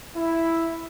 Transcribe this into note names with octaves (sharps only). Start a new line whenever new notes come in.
E4